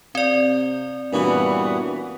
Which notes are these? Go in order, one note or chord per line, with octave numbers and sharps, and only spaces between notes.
C3 C4 D5
G2 A#2 E3 B3 C#4 F#4